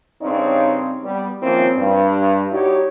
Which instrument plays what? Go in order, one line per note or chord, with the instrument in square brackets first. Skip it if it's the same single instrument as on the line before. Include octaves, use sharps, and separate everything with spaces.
[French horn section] G2 C#3 C4 D#4 C#5 D5
G3 B3
D#3 F3 A#3 C4 C#4 E4
G2
D#4 E4 F#4 G4 C#5 D5